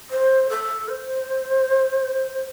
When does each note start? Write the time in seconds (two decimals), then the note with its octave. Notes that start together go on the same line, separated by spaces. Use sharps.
0.10 C5
0.50 A4
0.89 C5